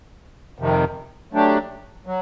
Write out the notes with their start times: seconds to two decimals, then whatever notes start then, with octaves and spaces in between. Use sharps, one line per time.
0.59 F2 C3 D#3
1.33 F#3 A3 D4 G4
2.06 F#3